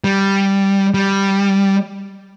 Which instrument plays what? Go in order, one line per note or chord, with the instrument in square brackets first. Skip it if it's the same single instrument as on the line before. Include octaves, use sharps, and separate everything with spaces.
[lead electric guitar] G3
G3